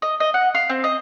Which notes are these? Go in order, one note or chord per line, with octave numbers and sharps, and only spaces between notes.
D#5
D#5
F#5
F5
C4
D#5